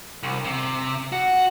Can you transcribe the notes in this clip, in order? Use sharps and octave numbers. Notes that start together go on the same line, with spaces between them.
C2
C3
F#4